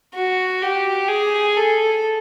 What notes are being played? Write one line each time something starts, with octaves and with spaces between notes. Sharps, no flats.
F#4
G4
G#4
A4